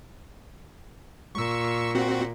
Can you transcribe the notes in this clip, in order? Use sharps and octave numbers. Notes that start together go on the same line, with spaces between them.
A#2 C#6 E6
C4 F#4